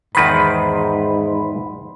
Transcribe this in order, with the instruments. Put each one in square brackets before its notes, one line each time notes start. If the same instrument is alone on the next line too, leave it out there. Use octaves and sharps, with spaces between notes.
[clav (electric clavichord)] E2 D#3 B4 [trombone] G#2 [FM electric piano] B5 C6